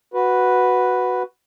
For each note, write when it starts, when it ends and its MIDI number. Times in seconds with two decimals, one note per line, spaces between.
0.14 1.23 66
0.14 1.23 71